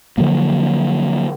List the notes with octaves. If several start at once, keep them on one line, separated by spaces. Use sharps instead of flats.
D3 F3 F#3 A#3